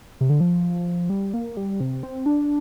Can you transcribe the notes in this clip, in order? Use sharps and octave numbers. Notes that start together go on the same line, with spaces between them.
C3
D3
F3
G3
A#3
G3
C3
C4
D4